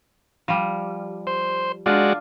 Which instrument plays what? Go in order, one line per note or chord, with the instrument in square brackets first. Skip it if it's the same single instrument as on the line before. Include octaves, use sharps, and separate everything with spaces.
[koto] F3 G3
[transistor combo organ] C5
[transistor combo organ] G#3 F#4 D5 [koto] D4 F4